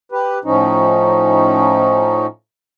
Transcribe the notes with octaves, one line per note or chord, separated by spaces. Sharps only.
G4 B4
A2 F3 C#4 D#4